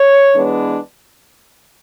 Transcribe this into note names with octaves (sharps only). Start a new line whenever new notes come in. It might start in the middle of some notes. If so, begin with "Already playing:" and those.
Already playing: C#5
E3 G#3 B3 D4